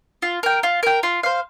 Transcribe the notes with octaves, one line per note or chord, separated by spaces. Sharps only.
F4
A#4 G5
F4
A#4 G5
F4
C5 F5